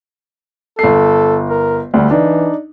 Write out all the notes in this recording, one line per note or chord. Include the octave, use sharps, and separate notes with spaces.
G1 A4 C7
A#4
D2 G3
E3 D4 D#4